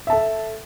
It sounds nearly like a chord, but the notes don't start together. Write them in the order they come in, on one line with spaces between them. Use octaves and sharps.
E5 A5 A4